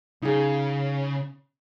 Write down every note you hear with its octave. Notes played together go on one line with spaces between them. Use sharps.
C#3 D#4 G#4